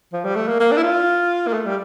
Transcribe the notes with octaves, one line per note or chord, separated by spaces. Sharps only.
F3
G3
A3
A#3
A#3
D4
E4
F4
A#3
A3
G3